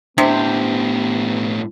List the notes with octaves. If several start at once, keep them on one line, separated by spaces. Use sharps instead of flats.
A2 C3 B3 D4 G4 C5